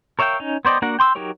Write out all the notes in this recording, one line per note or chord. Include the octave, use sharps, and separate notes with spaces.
A#4 C#5 E5 F5 G5
C#4 D#4
B3 C5 D5 D#5 G5
A#3 D4 F#4 A#4 F#5
G5 C6 D6 E6
F#3 D#4 G4 A#4 C#5